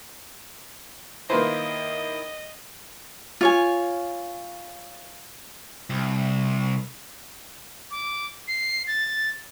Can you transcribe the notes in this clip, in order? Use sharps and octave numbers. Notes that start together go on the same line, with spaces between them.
D#3 A#3 E4 B4 C5 D#5
F4 C#5 G#5
C2
D6
C7
A6